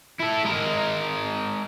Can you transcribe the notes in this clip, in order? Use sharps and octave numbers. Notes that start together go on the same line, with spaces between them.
E4 A4
G#3 A#4